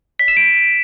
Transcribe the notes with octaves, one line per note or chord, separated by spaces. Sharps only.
B6
E7
D7